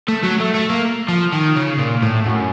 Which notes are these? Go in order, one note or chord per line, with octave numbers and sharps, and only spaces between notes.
A3
F#3
A3
A3
A#3
F3
D#3
C#3
A#2
A2
F#2